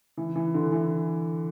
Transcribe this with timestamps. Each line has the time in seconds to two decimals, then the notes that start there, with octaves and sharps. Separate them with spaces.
0.17 E3
0.36 E3
0.54 D3
0.72 E3